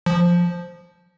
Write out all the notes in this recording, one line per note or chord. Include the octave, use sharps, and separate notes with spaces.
F3